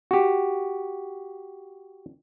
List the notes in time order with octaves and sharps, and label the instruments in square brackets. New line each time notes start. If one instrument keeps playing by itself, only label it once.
[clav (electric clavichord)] F#4 G4